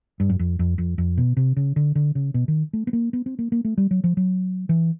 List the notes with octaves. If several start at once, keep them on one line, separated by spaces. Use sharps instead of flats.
G2
F#2
F2
F2
F2
F2
B2
C3
C#3
D3
D3
C#3
B2
D#3
A3
B3
A#3
B3
C4
A#3
A#3
A3
G3
F#3
F3
F#3
E3